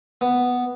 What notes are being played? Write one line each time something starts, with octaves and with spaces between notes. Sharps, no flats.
B3